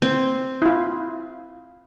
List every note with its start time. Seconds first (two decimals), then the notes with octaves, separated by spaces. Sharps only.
0.02 C4
0.62 E4 F4